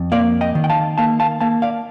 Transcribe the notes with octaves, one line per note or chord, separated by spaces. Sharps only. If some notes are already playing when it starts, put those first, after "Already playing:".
Already playing: F2
A#3 D5 F5
D#5 G5
D#3
G5
F5 A5
A#3 F5 A5
F5 A5
A#3 F5 A5
D5 F5